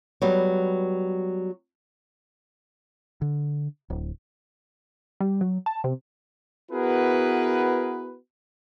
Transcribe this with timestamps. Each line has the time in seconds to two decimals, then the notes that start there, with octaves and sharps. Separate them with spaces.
0.22 F#3 G3 B3
3.22 D3
3.90 D1
5.21 G3
5.41 F#3
5.66 A5
5.84 C3
6.72 B3 E4 F#4 G#4 A#4 B4